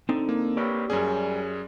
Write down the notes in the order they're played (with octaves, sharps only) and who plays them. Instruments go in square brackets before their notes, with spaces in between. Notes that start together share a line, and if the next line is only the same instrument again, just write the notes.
[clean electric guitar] D3 [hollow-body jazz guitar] C4 D#4
[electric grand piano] A#3
[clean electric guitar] G4 B4 C#5 [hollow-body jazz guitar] D5
[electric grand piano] F#2 C#4 G#4 [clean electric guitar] G3